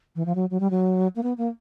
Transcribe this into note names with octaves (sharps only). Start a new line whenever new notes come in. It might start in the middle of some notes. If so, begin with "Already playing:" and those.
E3
F3
F#3
F#3
G3
F#3
A#3
B3
A#3